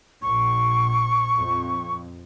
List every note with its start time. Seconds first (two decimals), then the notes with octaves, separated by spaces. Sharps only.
0.22 A#1 C#6
1.36 F2